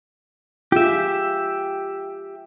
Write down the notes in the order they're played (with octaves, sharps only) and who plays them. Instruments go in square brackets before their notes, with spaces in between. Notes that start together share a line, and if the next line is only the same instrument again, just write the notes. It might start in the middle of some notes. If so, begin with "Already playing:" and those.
[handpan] F4 G#4 [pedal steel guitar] G4 E5